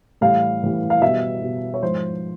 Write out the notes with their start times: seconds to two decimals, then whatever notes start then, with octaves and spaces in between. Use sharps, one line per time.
0.21 A2 E3 G3 F5
0.63 A2 E3 G3
0.90 F5
1.01 B2 G3 E5
1.42 B2 G3
1.74 C#5
1.83 G#2 F3 C5